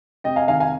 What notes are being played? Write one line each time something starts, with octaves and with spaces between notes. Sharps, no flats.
C3 D#5 G5
F5 G#5
D#3 F5 G#5
F5 G#5